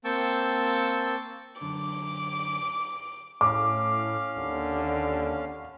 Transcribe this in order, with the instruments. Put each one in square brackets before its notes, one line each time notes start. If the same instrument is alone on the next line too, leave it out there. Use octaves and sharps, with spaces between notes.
[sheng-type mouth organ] A#3 C4 G5 A5 C#6 E6
[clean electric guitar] F#2 D3 [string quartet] D6
[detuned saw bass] A2 [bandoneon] C#4 F5 [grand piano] D6
[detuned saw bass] D#2 [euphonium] D3